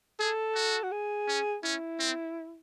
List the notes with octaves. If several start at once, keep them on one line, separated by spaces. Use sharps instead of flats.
G#4 A4
F#4
F#4
G#4
C#4
C#4 E4
C4